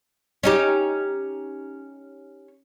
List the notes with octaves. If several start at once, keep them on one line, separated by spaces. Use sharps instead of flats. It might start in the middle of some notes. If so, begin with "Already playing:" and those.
C#4 D#4 G4